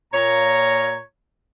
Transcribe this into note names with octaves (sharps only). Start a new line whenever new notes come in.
A#2 C#5 A#5